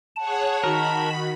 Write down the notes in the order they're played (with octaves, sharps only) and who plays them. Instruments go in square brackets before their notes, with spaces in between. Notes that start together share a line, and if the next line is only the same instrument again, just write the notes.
[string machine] G#4 C#5 F#5 [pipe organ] A5
[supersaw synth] D#3 F#4 [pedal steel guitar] A#4 [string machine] B5